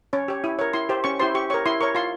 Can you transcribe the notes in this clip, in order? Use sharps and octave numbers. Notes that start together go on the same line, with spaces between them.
C#4 C#5
G4 C#5
E4
A#4 C#5
E4 C6
G4 C5
C#4 C#6
E4 G4 C5 C6
G4 C#6
A#4 C#5 C#6
E4 C6
A#4 C#5 C#6
F4 C6